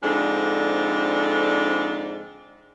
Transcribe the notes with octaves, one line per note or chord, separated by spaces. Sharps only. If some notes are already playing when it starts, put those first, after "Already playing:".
F2 G#2 D3 D4